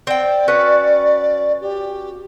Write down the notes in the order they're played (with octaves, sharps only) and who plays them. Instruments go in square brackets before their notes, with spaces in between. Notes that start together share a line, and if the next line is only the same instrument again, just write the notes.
[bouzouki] C4 G5 [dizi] D5
[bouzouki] C#4 F#4 B4
[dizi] G4